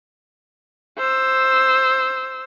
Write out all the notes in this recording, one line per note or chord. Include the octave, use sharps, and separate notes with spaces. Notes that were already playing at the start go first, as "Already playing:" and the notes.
C5 E6